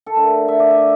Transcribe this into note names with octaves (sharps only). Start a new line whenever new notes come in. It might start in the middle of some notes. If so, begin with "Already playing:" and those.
A4
D3 A3 A#4
E5
D5
E5